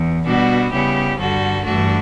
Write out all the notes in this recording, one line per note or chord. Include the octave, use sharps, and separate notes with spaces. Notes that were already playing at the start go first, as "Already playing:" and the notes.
Already playing: E2
B2 G3 B3 D4 F#4
C#3 G3 B3 E4 G4
G2 D3 G3 F#4 A4
G2 E3 A3 D4 F#4